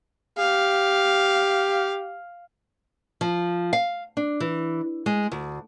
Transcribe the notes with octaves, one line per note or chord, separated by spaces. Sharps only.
G4 F5
F3
F5
D4
E3
G#3
D2